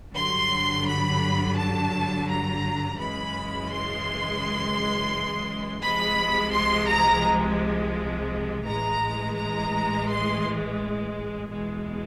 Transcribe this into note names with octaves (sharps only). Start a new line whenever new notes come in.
G2 D3 F#3 C6
B5
A5
A#5
F#2 C#3 E3 G#3 B5
C6
C2 C3 F3 G#3 B5
C6
A#5
A1 A2 E3 G#3 A#5
A#5
C6
E2 B2 G#3